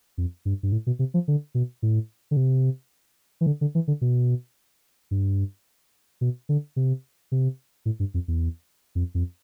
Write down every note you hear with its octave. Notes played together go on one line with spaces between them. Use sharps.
F2
G2
G2
A2
B2
C3
F3
D3
B2
A2
D3
C3
E3
D3
D3
E3
D3
B2
G2
B2
D3
C3
C3
A2
G2
F2
E2
F2
F2